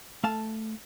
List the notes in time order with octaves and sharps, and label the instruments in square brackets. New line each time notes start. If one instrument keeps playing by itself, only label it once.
[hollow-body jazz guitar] A3 F5 A5